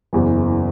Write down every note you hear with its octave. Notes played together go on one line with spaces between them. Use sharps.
F#1 E2 E3